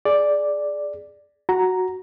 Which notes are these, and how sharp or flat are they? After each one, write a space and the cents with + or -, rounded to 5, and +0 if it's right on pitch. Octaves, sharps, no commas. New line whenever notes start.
G#4 +10 D5 +0
F#4 +0 A#5 +0